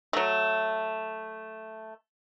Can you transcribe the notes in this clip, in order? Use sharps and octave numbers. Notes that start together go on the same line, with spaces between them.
F#3 A3